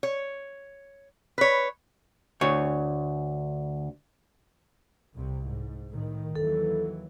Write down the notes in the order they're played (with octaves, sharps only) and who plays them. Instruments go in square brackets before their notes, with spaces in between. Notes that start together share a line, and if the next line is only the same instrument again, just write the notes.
[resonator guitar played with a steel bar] C#5
B4 C#5
[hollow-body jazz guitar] D2 C#5
[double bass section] C2 C3
G#2
A2 D#3
[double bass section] D#2 E3 F#3 [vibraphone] A4